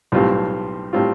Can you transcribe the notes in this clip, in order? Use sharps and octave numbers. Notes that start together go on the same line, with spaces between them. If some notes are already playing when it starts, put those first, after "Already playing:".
B1 A2 G3 C4 F4
A2 G3 C4 F4